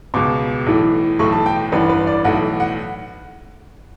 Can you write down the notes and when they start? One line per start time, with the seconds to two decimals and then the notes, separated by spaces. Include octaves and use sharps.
0.14 C#2 B2 D6
0.66 B1 A2 E3
1.19 B1 A2 E3 C#6
1.32 A5
1.46 G5
1.72 A1 G2 E3 B4
1.89 B4
2.07 D5
2.24 B1 A2 E3 F#5
2.60 F#5